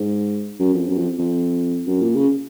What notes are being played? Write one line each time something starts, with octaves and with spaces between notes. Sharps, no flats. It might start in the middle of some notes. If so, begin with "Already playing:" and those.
Already playing: G#2
F#2
F2
F#2
F2
F2
F#2
A#2
C#3